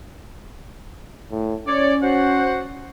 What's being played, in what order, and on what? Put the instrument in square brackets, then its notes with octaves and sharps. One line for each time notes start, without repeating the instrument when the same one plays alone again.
[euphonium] A2
[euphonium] C#4 [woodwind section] C#5 D5
[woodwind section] F#4 C5 F#5